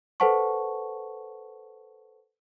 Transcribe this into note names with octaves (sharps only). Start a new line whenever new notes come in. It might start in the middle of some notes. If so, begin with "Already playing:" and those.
A4 B4 C5 F#5 A5 C#6